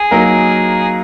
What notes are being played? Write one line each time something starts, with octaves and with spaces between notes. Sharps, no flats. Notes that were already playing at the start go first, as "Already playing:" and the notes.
Already playing: G#4
F#3 A#3 D#4 A#4